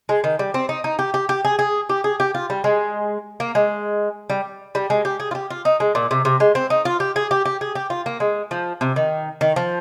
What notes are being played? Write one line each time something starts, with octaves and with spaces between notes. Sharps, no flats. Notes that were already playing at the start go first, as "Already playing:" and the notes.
G#3
D#3
G3
C4
D#4
D#4
G4
G4
G4
G#4
G#4
G4
G#4
G4
F4
G3
G#3
A#3
G#3
G3
G3
G#3
G4
G#4
F4
G4
F4
D#4
G#3
A#2
C3
C3
G#3
C4
D#4
F4
G4
G#4
G4
G4
G#4
G4
F4
A#3
G#3
F3
C3
D#3
D#3
F3